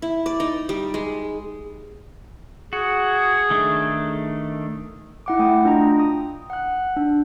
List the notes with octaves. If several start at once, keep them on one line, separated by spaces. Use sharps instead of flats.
E4
D5
D#4
G3
G#3
F#4 G#4
D#3 A3 D4
E4 F#5 D6
A3 G5 D#6
D4 F4 D#5 G5 A#5
D#6
F#5 F#6
D4